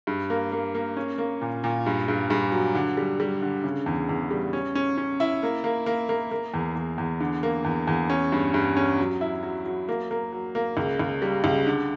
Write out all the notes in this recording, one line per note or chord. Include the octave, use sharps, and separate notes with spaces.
G2
A#3
A#3
A#3
C#4
A#3
A#2
A#2
G2
G2
G2
F#3
D3
G3
G3
D3
C#3
E2
E2
G3
C#4
C#4
C#4
E4
A#3
A#3
A#3
A#3
A#3
E2
E2
E2
D3
A#3
E2
E2
C#4
G2
G2
C#4
F#3
E4
F#3
F#3
A#3
A#3
F#3
A#3
C#2
C#2
G3
C#2
D3